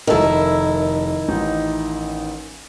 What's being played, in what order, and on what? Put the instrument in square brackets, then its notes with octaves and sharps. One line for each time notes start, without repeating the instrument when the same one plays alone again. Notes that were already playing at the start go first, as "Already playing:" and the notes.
[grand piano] F1 A4 A#4 [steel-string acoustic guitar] D#3 E4
[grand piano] A1 D#4